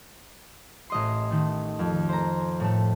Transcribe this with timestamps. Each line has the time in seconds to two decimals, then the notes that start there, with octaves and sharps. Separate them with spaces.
0.90 A1 D#5 C6
1.30 D#3 A3
1.79 F2
2.09 C5 A#5
2.60 A2 A3